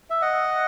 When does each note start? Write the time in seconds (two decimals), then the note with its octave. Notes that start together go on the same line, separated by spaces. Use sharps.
0.10 E5
0.21 D#5 F#5